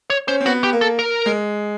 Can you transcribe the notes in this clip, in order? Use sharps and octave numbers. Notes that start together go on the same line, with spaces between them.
C#5
C#4 C5
C4
B3 F#4
G4
A#3
A4
A#4
G#3